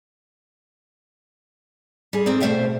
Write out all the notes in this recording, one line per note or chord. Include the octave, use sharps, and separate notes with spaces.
G3 G#4
G#2 C4 G#4 A#4 D5
B2 A3 C5 E5 F5 G5